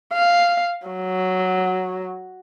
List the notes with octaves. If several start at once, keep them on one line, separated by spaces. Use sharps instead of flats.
F5
F#3